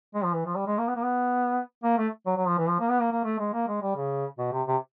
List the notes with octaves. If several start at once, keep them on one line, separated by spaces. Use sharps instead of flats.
G#3
F3
E3
F3
G3
G#3
A#3
B3
A#3
B3
A#3
A3
F#3
F#3
F3
E3
F3
A#3
B3
A#3
A#3
A3
G#3
A#3
G#3
G3
C#3
B2
C3
C3